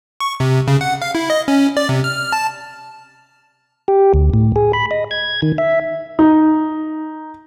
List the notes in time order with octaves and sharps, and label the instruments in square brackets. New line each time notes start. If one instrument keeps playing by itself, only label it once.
[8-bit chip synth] C#6
C3
C#3
F#5
F5
E4
D#5
C#4
D5
C3
F6
A5
[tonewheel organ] G4
D2
A2
G#4
B5
D#5
G#6
D#3
E5
[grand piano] D#4